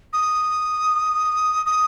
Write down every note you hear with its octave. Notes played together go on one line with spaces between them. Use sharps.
D#6
D#6